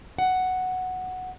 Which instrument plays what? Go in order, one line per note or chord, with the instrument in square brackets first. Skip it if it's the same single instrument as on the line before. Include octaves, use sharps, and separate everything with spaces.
[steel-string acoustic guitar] F#5